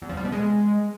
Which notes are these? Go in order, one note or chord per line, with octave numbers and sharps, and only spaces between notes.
E2
F3
G3
B2
G#3